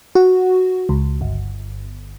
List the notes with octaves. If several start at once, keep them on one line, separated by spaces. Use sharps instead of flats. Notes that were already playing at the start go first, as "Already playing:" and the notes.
F#4
C#2
G1